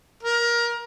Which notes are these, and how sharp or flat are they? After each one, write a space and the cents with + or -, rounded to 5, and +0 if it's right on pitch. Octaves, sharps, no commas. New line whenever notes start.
A#4 +20